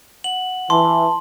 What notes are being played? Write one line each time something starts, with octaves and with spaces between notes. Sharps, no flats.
F#5 F#7
E3 A5 C6